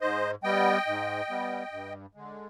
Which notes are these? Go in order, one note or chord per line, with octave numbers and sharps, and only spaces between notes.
G#2 C5 D#5
G3 B3 D#5 G5
G#2
G3 B3
G2
D3 G#3